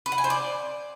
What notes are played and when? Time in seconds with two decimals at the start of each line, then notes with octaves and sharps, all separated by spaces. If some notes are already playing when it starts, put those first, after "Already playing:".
0.06 B4
0.12 F#5
0.18 G#5
0.24 C5
0.30 D5